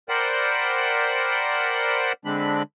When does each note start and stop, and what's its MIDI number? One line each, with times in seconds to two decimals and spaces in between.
0.09 2.12 70
0.09 2.12 72
0.09 2.12 74
0.09 2.12 78
0.09 2.12 79
0.09 2.12 83
2.25 2.63 50
2.25 2.63 56
2.25 2.63 60
2.25 2.63 62
2.25 2.63 83